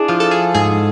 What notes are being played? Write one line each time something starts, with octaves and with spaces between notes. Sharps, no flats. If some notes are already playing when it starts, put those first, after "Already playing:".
Already playing: D4 E4 G#4
F3 F4
A4
G#4
G#2 G#4